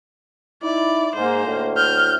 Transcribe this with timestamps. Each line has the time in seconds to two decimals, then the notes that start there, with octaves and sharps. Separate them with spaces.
0.63 D#4 E4 D5
1.15 G#2 A#3 C5
1.45 D2 A2
1.77 F6 G6